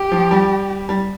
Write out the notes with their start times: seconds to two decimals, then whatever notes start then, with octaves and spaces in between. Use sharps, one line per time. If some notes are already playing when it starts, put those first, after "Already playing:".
Already playing: G4
0.11 F3
0.31 G3
0.89 G3